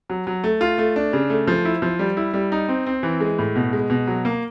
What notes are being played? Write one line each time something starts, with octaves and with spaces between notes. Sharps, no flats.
F#3
F#3
A3
F4
A3
D4
C#3
A3
F3
E4
F3
G3
E4
G3
D#4
C4
C4
E3
G#3
A2
B2
G#3
B2
F#3
A#3